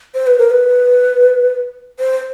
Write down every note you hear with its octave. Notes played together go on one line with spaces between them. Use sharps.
C5
B4
A#4
B4
C5